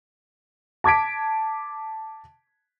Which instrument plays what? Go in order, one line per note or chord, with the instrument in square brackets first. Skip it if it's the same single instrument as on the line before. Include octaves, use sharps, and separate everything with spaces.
[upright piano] A5 D6 G#6 B6 D7